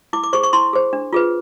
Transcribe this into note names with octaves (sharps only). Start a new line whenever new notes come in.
E4 D6
D6
G#4 C5 C#6
C#6
E4 C6
G#4 C5
D4
F4 G#4 B4